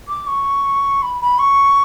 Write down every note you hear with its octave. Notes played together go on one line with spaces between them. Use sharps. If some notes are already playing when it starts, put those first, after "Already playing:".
D6
C#6
B5
B5
C#6